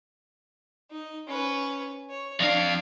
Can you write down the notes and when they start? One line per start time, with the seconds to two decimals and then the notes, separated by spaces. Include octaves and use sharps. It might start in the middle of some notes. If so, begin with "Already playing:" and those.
0.91 D#4
1.28 C#4 B4
2.10 C#5
2.40 F2 D4 F5